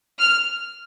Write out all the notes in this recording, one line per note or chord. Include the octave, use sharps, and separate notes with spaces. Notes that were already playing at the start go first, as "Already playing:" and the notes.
F6